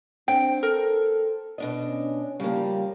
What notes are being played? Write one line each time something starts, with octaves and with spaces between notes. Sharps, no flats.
C4 D4 G5
A4 A#4
B2 D4 D#5
C#4
C#3 F3 G3 A#3